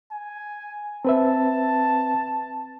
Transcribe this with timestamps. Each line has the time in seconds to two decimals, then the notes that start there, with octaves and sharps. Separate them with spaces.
0.11 G#5
1.05 C4 B4 E5 A5